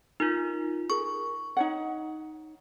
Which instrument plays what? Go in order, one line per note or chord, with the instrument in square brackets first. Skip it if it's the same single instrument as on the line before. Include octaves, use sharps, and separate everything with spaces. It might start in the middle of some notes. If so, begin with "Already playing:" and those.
[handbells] D#4 F4 [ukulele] A#4
[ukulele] G#4 A#4 [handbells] C#6
[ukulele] D#4 C#5 F#5